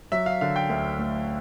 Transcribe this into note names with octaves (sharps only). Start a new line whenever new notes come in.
F#3 E5
F5
D3 F5
G5
D2
A3